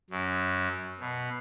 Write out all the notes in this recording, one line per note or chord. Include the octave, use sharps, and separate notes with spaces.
F#2
B2